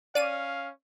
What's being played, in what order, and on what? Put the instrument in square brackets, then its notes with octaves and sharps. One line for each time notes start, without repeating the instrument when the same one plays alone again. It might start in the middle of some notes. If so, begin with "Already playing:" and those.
[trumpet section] C#4 F5 [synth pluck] D5 D#7